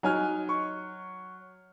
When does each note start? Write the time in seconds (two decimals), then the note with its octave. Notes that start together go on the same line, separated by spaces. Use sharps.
0.03 F#3 D#4 G#5 F6
0.49 C#6